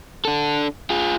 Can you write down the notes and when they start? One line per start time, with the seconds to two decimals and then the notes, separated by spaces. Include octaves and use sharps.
0.25 D4 A4
0.90 F4 G#4